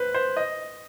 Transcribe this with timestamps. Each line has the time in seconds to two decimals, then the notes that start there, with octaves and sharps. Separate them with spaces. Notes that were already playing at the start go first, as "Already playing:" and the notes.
Already playing: B4 C5
0.14 C5
0.37 D#5